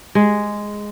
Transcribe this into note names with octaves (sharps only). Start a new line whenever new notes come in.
G#3